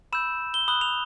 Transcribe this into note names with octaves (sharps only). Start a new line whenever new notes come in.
B5 E6 G6 E7
G7
B5 D#6 F#6 G7
F7